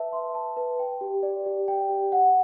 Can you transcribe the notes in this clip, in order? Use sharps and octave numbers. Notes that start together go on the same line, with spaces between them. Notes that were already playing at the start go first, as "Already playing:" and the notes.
Already playing: B4 E5 A5
C6
A5
B4
G5
G4
D5
G4
G5
G4
F#5